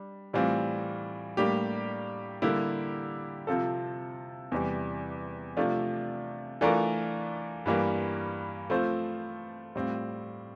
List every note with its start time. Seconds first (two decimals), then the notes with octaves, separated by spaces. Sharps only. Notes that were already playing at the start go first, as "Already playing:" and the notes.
Already playing: G3 D4
0.33 A2 E3 G3 C4 F4
1.37 A2 G3 A#3 D4 G4
2.42 D3 G3 A#3 E4 G4
3.47 C3 F3 C4 F4 A4
4.52 E2 C3 E3 G3
5.57 C3 F3 A3 D4 F4
6.61 E3 A3 D4 F4 A#4
7.66 G2 E3 G3 A#3
8.70 F3 A3 C4 F4 C5
9.75 A2 G3 C4 F4